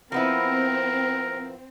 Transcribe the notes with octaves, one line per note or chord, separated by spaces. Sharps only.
F3 B3 C4 E4 A#4